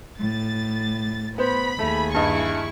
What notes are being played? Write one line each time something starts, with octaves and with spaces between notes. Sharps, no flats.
A2 A6
B3 C5 B5
D#2 A3 G#4
G2 E4 D#5 C#6